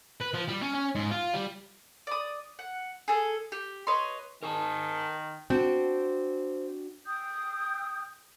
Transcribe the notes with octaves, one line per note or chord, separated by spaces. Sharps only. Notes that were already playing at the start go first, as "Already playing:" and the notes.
B4
F3
G3
C#4
C#4
G#2
F4
G3
D5 D#6
F#5
G#4 A4
G4
B4 C#5 D#5 C6
D#3 A#4 G#5 A5
C4 D4 F#4 G5
G5 D#6 E6 G6